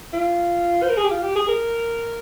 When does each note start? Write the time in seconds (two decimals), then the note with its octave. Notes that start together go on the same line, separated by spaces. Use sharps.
0.13 F4
0.83 C5
0.89 A#4
0.97 G#4
1.04 G4
1.11 F4
1.23 G4
1.35 G#4
1.48 A#4